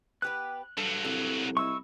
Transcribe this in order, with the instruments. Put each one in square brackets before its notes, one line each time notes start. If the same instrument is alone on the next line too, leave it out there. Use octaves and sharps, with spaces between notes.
[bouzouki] B3 G4 B4 [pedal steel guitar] F#6
[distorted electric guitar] G2 F#3 [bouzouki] A4
[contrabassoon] C2 [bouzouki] A4
[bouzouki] D#4 E4 [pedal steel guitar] C#6 E6